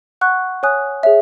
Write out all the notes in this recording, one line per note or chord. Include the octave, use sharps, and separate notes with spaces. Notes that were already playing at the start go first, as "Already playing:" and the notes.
F#5 C#6 F#6
C#5 G#5 D#6 F#6
G#4 C#5 E5